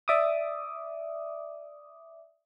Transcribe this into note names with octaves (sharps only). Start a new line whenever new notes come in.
D5 E5 D6 D#6